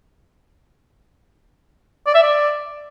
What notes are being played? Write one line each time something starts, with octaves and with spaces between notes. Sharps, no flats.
D5
E5
D5